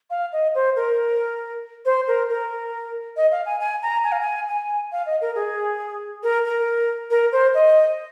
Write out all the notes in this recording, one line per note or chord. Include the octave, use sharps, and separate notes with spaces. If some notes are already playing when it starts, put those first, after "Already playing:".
F5
D#5
C5
A#4
C5
A#4
A#4
D#5
F5
G#5
G#5
A#5
G#5
F5
G#5
G#5
F5
D#5
A#4
G#4
A#4
A#4
A#4
C5
D#5